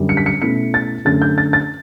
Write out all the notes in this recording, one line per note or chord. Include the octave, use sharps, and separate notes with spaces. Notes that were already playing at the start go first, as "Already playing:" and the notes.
Already playing: F#2 D3 G3 C#4
C#7
B6
C#7
B2 A3 C#4 E4 C#7
A6
F#2 D3 A3 C#4 A6
G6
A6
A6